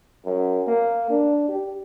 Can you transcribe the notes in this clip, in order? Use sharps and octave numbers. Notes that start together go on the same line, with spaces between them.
F#2
A#3
D4
G4